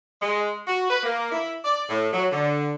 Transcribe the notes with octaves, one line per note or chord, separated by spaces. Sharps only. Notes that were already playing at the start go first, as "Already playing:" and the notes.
G#3
F#4
B4
A#3
E4
D5
A2
F#3
D3